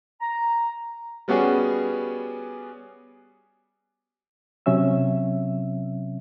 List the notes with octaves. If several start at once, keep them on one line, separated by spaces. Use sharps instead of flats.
A#5
G3 B3 C#4 F#4 G#4 D5
C3 F#3 C#4 E5 E6